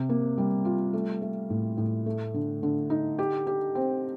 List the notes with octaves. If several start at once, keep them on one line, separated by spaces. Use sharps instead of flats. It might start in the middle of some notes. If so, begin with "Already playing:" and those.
Already playing: C3
A#3
G3
F4
A3
A3
A2
A2
A3
D3
D3
D#4
G4
G4
C4